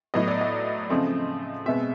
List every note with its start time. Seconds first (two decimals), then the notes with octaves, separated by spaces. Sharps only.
0.14 A2 F#3 B3 D#5
0.28 D5
0.41 D#5
0.90 C#3 F3 A3 C4
1.66 B2 G#3 C4 E5